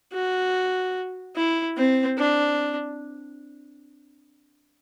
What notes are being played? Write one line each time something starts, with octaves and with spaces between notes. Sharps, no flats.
F#4
E4
C4
D4